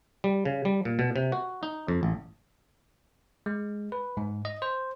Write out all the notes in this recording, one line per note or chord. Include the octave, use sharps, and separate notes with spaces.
G3
C#3
G3
A#2
B2
C3
F#4
D#4
F2
A1
G#3
B4
G#2
D#5
C5